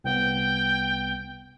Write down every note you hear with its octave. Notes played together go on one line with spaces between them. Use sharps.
C2 B3 G5